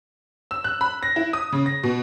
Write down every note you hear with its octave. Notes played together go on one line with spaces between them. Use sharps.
E6
F#6
B5
A#6
E4
D#6
C#3
A#6
B2